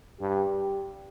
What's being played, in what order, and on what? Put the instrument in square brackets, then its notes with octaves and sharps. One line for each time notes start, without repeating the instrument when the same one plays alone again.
[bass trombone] G2 [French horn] G4